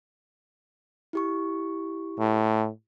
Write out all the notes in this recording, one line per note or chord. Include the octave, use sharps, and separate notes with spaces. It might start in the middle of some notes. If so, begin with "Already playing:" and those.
E4 G4 C#6
A2